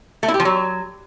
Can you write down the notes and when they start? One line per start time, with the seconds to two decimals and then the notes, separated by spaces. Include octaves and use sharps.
0.23 A3
0.28 E4
0.34 G4
0.40 F3
0.45 F#3